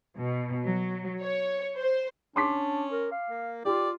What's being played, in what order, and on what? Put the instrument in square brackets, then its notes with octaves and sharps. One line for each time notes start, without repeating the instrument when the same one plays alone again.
[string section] B2
F#3
C#5
C5
[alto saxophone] C#4 [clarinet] D4 [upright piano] C6 D6 B6
[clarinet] A#4
F5
[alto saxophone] A#3
[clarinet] F4 [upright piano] G4 [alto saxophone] D5